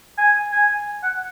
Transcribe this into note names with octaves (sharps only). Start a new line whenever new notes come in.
G#5
G#5
F#5